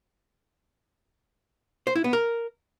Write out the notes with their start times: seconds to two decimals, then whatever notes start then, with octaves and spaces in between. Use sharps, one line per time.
1.87 C5
1.96 E4
2.04 B3
2.13 A#4